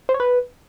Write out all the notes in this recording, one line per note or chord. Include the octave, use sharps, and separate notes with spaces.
C5
C#5
B4